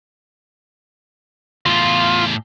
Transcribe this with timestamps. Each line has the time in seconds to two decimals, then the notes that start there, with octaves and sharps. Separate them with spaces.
1.66 E2 A2 F4